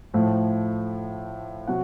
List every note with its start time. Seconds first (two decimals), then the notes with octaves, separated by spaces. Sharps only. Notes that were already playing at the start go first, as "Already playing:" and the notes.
0.14 A2 F3 A3
1.67 C3 F#3 F#5